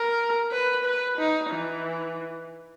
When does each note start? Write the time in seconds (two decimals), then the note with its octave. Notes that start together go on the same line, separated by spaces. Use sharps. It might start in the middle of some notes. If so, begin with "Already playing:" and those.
Already playing: A#4
0.52 B4
0.85 B4
1.18 D#4
1.51 E3